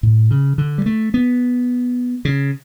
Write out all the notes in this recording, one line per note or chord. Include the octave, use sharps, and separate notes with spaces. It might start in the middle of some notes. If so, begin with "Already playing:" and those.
A2
C#3
D3
G3
A3
B3
C#3